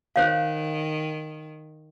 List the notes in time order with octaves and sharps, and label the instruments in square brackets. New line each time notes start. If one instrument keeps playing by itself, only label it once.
[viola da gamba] D#3 [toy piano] C5 C#5 F5